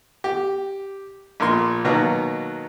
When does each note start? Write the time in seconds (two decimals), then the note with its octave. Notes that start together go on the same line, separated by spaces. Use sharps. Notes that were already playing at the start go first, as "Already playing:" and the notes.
0.24 G4
1.40 A#1 A#2 A#4 C6
1.84 B2 D#3 F#3 A#3 B3